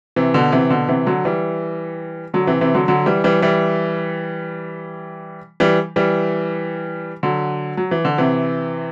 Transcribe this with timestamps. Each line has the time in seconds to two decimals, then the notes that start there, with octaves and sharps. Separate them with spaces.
0.16 C3 E3
0.34 B2 D3
0.52 C3 E3
0.70 B2 D3
0.88 C3 E3
1.07 D3 F#3
1.25 E3 G3
2.34 D3 F#3
2.47 C3 E3
2.61 C3 E3
2.75 D3 F#3
2.88 D3 F#3
3.06 E3 G3
3.24 E3 G3
3.42 E3 G3
5.60 E3 G3
5.96 E3 G3
7.23 D3 F#3
7.77 F#3
7.91 E3
8.05 D3
8.18 C3 E3